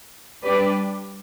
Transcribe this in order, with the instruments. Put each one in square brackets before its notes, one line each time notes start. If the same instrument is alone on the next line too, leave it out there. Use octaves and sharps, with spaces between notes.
[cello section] G3 D4 G4 B4 D5